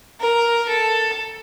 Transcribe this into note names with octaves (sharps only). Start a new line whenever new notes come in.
A#4
A4